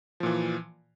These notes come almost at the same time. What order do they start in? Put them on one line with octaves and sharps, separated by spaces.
F3 A#2 E3